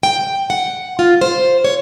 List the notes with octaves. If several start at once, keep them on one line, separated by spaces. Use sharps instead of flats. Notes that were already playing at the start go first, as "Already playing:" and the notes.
G5
F#5
F4
C5
C#5